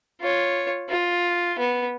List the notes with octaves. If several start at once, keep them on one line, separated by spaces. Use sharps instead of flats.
F4 C#5
F4
B3